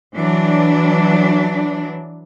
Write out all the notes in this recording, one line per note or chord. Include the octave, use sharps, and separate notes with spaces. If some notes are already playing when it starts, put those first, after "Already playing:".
E3 F#3 D4